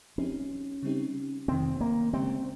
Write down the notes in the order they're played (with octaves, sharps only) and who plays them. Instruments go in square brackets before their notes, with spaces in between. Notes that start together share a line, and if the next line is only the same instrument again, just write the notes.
[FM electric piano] F3 C4 D#4 G4 [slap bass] C#4
[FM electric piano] C#3 G3 C4 D#4 G4
[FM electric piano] F2 C3 D#3 [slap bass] C4
[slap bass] A#3
[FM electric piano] C#3 G#3 C#4 G4 [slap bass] C4